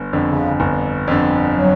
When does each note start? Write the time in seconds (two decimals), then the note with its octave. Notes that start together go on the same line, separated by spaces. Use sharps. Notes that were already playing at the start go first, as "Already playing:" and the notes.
Already playing: G1
0.13 F2 D3
0.29 C#3
0.60 G1
1.08 F2 D3
1.54 F#3